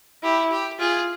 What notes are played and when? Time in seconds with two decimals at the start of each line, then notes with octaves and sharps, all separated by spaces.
0.23 E4 G4
0.52 G4
0.79 F4 G#4